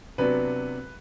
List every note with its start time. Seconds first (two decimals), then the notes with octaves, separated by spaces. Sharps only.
0.18 C3 F#3 B3 D4 B4